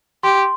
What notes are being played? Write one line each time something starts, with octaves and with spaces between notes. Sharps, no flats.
G4 C6